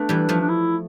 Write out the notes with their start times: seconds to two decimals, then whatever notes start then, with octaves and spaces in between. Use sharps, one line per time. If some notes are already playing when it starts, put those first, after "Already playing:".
Already playing: A3 B3 D4
0.09 E3 G3
0.29 F3 A3
0.41 D4
0.49 E4